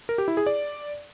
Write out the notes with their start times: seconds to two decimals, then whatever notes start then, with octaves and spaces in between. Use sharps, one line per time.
0.09 A#4
0.18 G4
0.28 E4
0.37 G#4
0.46 D5